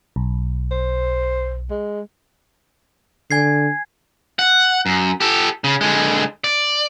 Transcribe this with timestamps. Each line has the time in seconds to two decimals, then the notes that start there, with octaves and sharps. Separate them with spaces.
0.16 B1
0.71 C5
1.70 G#3
3.31 D3 G#5 G#6 C7
4.39 F#5
4.86 F#2
5.20 G4 A4
5.64 C#3
5.81 D3 G#3
6.44 D5